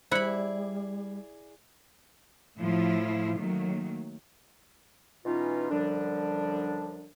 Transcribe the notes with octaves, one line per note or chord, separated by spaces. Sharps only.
G3 E4 G#4 C5 D5 B5 F#6 C#7
A2 F3 E4 F4
D#3 F#3 A3 A#3
B2 E3 C#4 D#4 F4
F#2 D3 F3 G3 D4